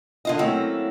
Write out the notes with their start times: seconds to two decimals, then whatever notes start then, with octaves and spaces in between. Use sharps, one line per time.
0.25 D3 F4 D#5
0.39 F#3 A3 A#3 C4 C#4 E4